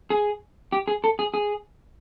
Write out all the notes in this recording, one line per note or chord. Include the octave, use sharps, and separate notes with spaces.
G#4
G4
G#4
A4
G#4
G#4